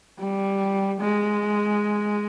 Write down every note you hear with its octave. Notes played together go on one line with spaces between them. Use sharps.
G3
G#3